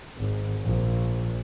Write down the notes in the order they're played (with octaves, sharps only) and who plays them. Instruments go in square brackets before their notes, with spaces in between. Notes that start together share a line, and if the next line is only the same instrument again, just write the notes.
[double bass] G#1
A#1